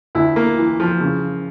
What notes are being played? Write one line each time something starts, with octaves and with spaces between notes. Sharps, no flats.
D2 E4
A#3
E3
F3
C#3